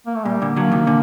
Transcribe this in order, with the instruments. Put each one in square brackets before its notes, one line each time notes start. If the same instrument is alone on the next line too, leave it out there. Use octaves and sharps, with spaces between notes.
[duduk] A#3
A3
[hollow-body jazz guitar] A#2 [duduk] G3
[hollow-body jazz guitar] A#2 D3
[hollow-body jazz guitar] D3 F#3 [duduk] A#3
[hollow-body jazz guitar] C3 D#3
A#2 D3